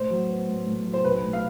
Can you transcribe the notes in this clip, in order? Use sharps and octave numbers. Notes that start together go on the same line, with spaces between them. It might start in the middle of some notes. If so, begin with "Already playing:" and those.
Already playing: A2 C5
F#3
B3
A2
A2
F#3
C5
B1 B4
A2
F5